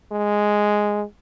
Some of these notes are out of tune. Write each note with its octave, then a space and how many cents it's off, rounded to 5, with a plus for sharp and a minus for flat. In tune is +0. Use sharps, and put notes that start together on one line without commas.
G#3 +0